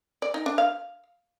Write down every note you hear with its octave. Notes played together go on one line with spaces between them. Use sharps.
D5
D#4
D4
F5